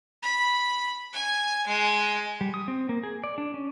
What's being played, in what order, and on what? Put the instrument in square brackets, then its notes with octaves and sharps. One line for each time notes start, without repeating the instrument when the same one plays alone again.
[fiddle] B5
G#5
G#3
[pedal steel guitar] G3
D#6
C4
A#3
G#4
D5
D4
C#4